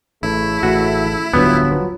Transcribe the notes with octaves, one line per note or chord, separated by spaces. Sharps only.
A1 C#3 A3 E4
A1 F#4
D1 G1 G2 F3 F#3 B3 B4